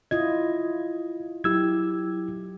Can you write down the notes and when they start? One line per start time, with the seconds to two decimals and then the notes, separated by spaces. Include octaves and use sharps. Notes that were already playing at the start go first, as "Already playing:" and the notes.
0.11 E4 F4 D#5 G#6
1.44 F#3 E4 G4 E6 G#6